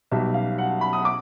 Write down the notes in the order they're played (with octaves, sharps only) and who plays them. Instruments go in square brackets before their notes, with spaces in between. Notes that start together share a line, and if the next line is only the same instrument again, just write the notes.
[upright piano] B1 B2 G3 E5
F5
F#5
B5
D#6
D6